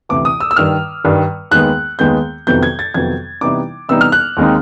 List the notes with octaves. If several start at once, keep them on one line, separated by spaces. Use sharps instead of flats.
D2 C3 E3 D6
D#6
E6
E6
G2 D#3 G3 F6
G2 D#3 G3
D#2 D#3 G#3 B3 F#6
D#2 D#3 G#3 B3 G6
F2 C3 D#3 F#3 B3 G6
G#6
A6
F2 C3 D#3 F#3 B3 G#6
C3 E3 G3 B3 D#4 D6
C3 E3 G3 B3 D#4 E6
F6
F#6
D#2 D#3 G#3 C4 D#4